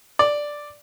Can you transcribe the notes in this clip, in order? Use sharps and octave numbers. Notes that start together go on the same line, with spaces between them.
D5